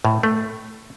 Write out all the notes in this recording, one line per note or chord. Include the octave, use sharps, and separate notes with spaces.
A2
A3